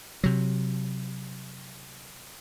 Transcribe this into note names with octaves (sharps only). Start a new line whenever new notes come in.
C3 F#3